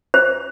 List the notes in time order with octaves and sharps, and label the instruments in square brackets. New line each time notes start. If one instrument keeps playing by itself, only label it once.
[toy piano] C5